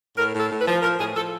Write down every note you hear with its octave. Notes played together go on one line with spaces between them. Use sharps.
A2 A#4
A2
A4
A2
B4
F3
F3 A#4
A2 G#4
F3 A4